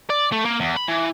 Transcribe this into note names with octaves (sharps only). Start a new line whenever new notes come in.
D5
A3
A#3
E2
B5
E3